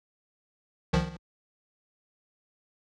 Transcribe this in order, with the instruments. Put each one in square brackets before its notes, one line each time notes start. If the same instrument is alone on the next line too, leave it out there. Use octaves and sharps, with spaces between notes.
[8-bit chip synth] C2 D#3 F3